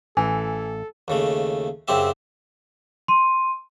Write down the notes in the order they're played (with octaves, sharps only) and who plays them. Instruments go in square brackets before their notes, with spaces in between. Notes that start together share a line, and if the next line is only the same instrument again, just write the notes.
[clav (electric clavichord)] A1 [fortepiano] E3 [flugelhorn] A4 [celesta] G#5
[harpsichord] D#2 C#3 A3
F#2 C#3 C4 G4 E5
[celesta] C6 D#7